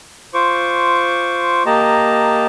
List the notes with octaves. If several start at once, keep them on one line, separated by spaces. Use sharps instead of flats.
F4 C5 C#6 D6
A#3 G4 D#5 A5 A#5